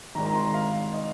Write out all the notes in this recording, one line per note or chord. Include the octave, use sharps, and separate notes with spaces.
G#1 G#2 D#3 A#5
A#5
C6
A#5
F5
D#5